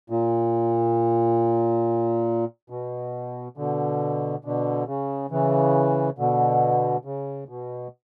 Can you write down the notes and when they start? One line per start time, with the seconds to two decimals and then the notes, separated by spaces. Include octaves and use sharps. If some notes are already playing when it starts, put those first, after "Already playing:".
0.10 A#2
2.70 B2
3.57 B2 D3
4.44 B2 D3
4.87 C#3
5.31 C#3 E3
6.18 B2 D3
7.05 C#3
7.49 B2